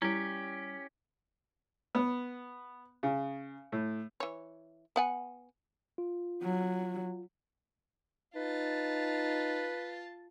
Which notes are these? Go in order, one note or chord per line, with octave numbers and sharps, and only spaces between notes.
G3 C#4 E4 G4 C#5
B3
C#3
A2
E3 C#5
B3 F#5 G#5
F4
F#3
D#4 F4 B4 A5